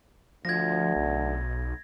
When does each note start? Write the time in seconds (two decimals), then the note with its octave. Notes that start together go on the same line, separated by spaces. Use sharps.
0.45 D2 F3 G#6 A#6
0.96 B1